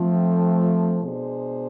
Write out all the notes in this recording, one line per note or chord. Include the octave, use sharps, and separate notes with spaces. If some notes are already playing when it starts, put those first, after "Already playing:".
Already playing: F3 A3 C4
B2 G#3 D4 G#4 C5